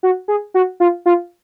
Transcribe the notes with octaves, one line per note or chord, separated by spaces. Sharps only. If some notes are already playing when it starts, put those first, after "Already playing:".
F#4
G#4
F#4
F4
F4